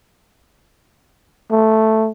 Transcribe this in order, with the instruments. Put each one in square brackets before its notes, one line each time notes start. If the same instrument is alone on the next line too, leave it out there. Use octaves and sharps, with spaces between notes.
[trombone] A3